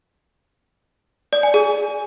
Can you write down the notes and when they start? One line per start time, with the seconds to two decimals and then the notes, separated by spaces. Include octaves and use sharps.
1.33 D5
1.43 G#5
1.54 G#4